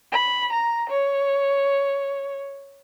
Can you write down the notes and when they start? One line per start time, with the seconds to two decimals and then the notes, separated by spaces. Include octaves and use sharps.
0.11 B5
0.51 A#5
0.89 C#5